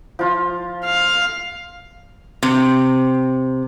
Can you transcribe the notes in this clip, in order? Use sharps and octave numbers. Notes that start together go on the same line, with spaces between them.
F3 F4
F5
C3